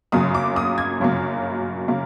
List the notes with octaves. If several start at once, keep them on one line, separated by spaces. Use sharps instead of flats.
G1 F#2 C#3 F#3 A#3 D#6
D6
D#6
G#6
G1 F#2 C#3 F#3 A#3
C#3 F#3 A#3